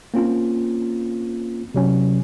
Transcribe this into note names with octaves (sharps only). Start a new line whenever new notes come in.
A#3 C4 C#4 F4
C3 F#3 C#4